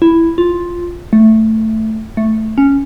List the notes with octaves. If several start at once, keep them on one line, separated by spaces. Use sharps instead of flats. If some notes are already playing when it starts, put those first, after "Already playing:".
E4
F4
A3
A3
C#4